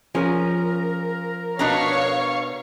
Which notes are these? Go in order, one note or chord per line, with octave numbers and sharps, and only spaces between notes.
F3 C#4 G#4 A#4
B2 D4 C#5 F5 A#5 C#6